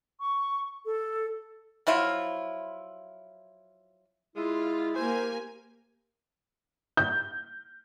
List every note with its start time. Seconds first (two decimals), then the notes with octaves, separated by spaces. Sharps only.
0.20 C#6
0.85 A4
1.87 F3 F#3 E4 F4
4.36 G#3 E4 F4
4.96 A#3 G4 C5 G#5
6.97 G6